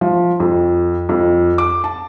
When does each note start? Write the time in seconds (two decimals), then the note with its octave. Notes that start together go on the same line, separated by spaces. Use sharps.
0.01 F3
0.40 F2
1.09 F2
1.58 D6
1.84 A5